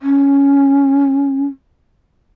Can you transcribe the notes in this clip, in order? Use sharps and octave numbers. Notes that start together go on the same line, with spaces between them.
C#4